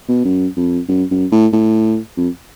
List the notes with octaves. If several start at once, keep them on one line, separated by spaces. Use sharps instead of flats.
B2
F#2
F2
F#2
F#2
A2
A2
F2